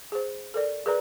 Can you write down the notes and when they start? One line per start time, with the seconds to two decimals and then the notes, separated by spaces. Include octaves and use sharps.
0.12 G#4 C5
0.54 A4 A#4 D5
0.86 G#4 A#4 B4 D5 A#5